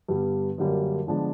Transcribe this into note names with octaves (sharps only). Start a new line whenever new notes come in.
G2 D3 G3 B3
F#2 D3 G3 A#3 D4
D3 F3 G#3 B3 D4